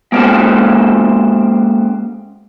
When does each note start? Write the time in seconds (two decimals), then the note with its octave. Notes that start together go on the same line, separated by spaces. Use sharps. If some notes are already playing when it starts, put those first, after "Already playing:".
0.12 G#3 A#3 C4 C#4 F#4 A4